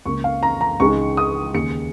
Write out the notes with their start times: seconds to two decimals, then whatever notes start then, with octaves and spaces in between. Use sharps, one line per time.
0.05 C#2 C#3 A#3 C#6
0.24 F5
0.43 A#5
0.61 A#5
0.80 C#2 C#3 G#3 D#4 C#6
1.17 D#6
1.54 D#2 C#3 G#3 C#7